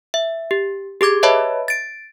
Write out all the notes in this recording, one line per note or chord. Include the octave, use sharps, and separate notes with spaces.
E5
G4
G4 G#4 D6 G#6
B4 C#5 D#5 E5 A5 B5
A6 D7